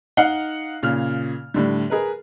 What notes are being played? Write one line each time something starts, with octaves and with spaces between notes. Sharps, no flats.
D#4 F5 F#5 F6 C7 G7
A#2 C#3 F6
A2 D3 G3
G#4 A#4 B4